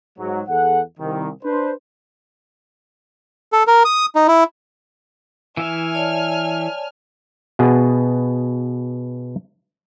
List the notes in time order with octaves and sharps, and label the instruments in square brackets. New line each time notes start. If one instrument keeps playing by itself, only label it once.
[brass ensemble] G#2 F#3
E2 G#4 A4 F#5
C2 D#3
D4 B4 C5
[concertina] A4
A#4
D#6
D#4
E4
[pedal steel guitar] E3 E5 [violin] G#5 F6
[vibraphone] C#5 D5 A5
[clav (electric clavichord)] B2 B3 G#4